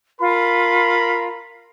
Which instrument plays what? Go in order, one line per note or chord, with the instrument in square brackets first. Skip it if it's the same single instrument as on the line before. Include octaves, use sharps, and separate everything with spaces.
[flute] F4 [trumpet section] A#4 B5